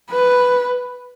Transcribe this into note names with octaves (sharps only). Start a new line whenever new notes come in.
B4